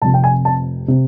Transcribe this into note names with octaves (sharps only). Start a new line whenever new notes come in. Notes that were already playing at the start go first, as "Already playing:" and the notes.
F1 F2 C3 A5
G5
G#5
A5
C3